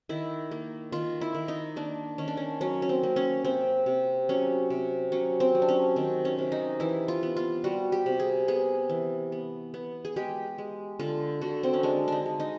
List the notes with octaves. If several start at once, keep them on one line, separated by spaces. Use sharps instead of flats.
D#3 E4
A#3
D#3 F4
E4
D#3
D#4
A#3 D4
D#3 C#4
D4
C#4
F#3 C#4
C#4
C4
A#3
C#4
C3 C4
C3
F#3 C#4
C3
F#3 C#4
C4
F#3
D4
C#4
D#3 C4
C#4
C3
D#4
E3 E4
F4
B3
F4
G3 F#4
G4
C3
G#4
B3 G#4
E3
B3
B3
G#4
G#3 G4
G#3
D3 F4
D3 F#4
C4
C#4
G#3 D4
D4 D#4
G#3
D#4